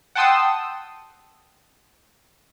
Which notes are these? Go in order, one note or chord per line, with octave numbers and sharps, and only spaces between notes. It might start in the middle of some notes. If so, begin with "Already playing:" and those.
F#5 G5 A5 C6 D#6 E6